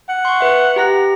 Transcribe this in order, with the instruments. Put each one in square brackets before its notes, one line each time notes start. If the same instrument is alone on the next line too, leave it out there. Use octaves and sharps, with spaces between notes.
[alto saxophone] F#5
[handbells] C6 C#6
B4 E5
G4 A#5 A#6